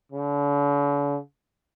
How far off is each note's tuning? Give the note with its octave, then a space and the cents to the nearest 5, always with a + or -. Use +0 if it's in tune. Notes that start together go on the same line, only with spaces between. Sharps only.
D3 -45